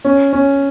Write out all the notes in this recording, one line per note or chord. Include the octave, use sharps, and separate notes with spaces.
C#4
C#4